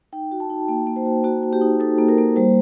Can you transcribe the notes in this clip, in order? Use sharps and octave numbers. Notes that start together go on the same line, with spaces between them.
D#4 G5
F#4
A5
D#4
A#3 G5
A#3
C5
F#4
A#3 F#4
F#4
G4
D#4
D#4 A4
A#3
A#4
A#3
G3 C5